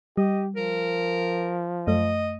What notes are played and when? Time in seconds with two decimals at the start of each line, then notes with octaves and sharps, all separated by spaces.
0.17 G3 G4 D#5
0.56 F3 A#4
1.87 F#2 A3 D#5